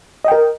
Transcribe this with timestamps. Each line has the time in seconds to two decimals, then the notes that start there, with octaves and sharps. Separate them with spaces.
0.25 D#5
0.28 G5
0.32 A#4